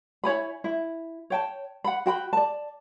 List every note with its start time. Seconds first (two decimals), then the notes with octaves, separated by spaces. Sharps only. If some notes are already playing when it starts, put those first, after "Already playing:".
0.24 E4 C#5 G#5 B5
0.64 E4
1.30 C#5 G5 A5
1.84 F#5 B5
2.06 F#4 G5 B5
2.33 D5 A5